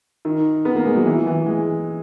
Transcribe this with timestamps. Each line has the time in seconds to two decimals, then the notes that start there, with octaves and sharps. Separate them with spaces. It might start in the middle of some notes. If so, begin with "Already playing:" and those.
0.25 D#3
0.65 B3
0.75 A#3
0.86 G#3
0.96 F#3
1.06 E3
1.27 E3
1.46 G#3